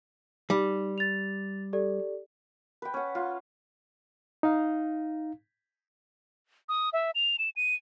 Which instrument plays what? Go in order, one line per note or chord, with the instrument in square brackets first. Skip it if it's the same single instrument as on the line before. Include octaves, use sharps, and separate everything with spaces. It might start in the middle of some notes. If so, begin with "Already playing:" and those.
[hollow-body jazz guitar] G3 [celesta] D#4
[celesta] A6 F7
G4 A4 D5
[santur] B4 G5
C#4 F#5
F4
[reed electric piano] D#4 F5
[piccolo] D#6
E5
F7
E7
D#7